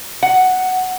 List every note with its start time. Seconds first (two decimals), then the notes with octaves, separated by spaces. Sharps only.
0.23 F#5